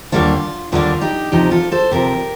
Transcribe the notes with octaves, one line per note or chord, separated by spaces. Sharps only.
D#2 D3 G3 A#3 D4 F4
D#2 D3 G3 A#3 D4 F4
D#4 G4
D2 C3 F3 D#4 G4
F4 A4
A4 C5
D2 C3 F3 G4 A#4